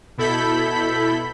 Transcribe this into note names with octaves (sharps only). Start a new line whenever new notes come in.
B2 E4 A4 B5 G6 B6